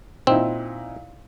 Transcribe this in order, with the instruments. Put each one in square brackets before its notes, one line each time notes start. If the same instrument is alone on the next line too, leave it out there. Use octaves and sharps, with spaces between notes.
[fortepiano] A#2 D#4 E4 [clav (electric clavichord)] C4